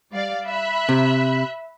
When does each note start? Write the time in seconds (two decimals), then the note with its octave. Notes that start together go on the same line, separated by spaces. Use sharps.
0.11 G3 D5 F5
0.45 E5 B5 F#6
0.89 C3